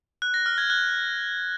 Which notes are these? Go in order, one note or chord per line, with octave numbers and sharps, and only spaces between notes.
F#6
A#6
F6
G#6
F#6